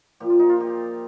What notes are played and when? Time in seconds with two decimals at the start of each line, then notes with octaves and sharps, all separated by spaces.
0.20 A#2 F3 G4
0.30 F4
0.39 D#4
0.49 F4
0.60 G4